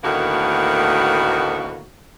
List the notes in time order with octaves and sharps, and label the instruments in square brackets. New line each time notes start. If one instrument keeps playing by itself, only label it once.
[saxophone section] D2 A2 D#3 A#3 B3 F#4